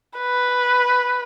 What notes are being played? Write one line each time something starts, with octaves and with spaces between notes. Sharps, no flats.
B4